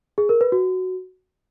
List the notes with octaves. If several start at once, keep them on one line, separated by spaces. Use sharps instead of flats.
G#4
A#4
B4
F#4